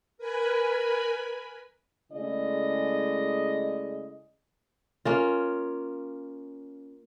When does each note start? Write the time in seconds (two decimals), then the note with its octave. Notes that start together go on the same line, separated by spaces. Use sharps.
0.18 A#4 B4 G#5 B5
2.13 C#3 G#3 A3 E4 D5 D#5
5.05 A#3 C#4 F4